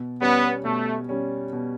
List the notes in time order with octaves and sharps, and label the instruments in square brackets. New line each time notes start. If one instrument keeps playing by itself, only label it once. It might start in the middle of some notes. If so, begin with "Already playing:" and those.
Already playing: [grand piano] B2
[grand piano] G3 C#4 [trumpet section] B3
[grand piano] B2 [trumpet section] A3
[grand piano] G3 C#4
B2